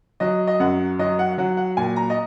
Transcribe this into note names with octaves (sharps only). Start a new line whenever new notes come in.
F#3 D#5
D#5
F#2 F#5
F#3 D#5
F#5
F#3 F#5
F#5
A#2 G#5
A#5
D#5